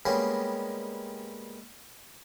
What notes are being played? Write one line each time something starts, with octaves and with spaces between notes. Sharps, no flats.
G3 G#3 A#3 B3 C#4 G4